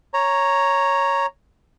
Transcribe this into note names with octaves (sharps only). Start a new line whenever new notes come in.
C#5 A#5